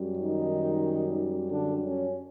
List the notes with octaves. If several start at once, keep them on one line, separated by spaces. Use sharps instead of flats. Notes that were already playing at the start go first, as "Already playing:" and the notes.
Already playing: F#2 G3
D#3 D#4
D3 D4
C#4